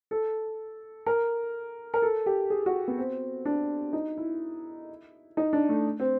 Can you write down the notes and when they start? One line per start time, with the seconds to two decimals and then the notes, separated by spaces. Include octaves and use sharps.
0.11 A4
1.07 A#4
1.94 A#4
2.02 A4
2.26 G4
2.50 G#4
2.66 F#4
2.88 B3
2.98 C4
3.45 D4
3.93 D#4
4.18 E4
5.37 D#4
5.53 D4
5.69 A3
6.00 C4